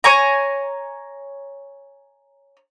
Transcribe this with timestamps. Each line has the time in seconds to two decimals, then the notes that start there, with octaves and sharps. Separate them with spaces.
0.04 C#5 G#5 A#5